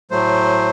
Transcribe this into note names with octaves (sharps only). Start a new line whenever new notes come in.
A2 F#3 A3 C5